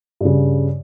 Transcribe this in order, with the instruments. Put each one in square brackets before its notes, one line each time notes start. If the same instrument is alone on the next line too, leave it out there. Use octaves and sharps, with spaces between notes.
[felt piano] G2 C#3